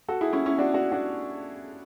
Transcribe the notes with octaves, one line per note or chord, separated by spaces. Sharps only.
F#4 A4
E4 G#4
C#4 E4
C#4 E4
D4 F#4
D4 F#4
D4 F#4